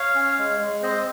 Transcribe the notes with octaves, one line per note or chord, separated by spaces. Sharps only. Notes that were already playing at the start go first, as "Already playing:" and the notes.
Already playing: C#5 F5
C#4
G#3
G#3
C4 C5 D#5